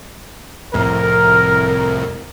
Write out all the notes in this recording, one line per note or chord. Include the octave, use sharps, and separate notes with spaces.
C2 F2 A2 A#4